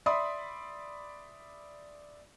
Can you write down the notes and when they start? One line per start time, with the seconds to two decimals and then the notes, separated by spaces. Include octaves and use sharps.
0.06 D5 E5 B5 C6 D#6